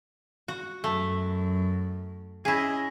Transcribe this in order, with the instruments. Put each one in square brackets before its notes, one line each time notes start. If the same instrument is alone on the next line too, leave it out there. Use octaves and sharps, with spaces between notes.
[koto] F#4
[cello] F#2 [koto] A3
[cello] C#4 D#5 [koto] E4 G#4